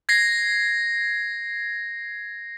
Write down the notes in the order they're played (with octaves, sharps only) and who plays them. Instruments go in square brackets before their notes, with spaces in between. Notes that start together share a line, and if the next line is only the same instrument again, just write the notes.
[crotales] G#6 A#6 C7